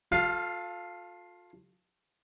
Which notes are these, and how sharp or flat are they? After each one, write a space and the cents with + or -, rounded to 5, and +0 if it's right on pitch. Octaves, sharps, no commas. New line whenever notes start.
F4 +35 A4 +0 F5 +0